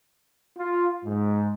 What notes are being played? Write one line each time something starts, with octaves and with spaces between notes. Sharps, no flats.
F4
G#2